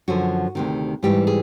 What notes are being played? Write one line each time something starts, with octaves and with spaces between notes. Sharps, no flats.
F#2 D3 F3 F#4
D2 C3 D#3
G#2 E3 G3 G4
G#4